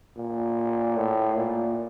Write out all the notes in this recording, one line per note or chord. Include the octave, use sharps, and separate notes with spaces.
A#2
A2
A#2